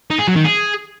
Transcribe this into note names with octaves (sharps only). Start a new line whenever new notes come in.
D#4
G#4
F#3
D#3
G#4